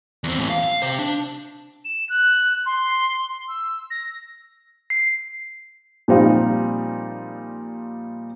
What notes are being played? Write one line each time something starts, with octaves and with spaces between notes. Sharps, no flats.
E2 C4
A2 E3
F5
F5
C3 C5
D4
E7
F#6
C6
E6
A#6
C7
A#2 F3 G3 C4 D#4 F4